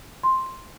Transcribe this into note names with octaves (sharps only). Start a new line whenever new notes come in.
C6